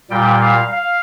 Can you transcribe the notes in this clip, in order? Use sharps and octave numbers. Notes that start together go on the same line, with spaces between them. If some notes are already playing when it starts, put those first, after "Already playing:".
A#2 G3 G5
F5
F5